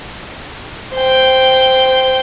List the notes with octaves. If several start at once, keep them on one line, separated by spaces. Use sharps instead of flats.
C5 G5